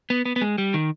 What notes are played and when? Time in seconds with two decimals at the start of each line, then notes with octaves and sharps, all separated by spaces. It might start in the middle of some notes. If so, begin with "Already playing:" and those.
0.10 B3
0.25 B3
0.36 B3
0.41 G#3
0.58 G3
0.74 D#3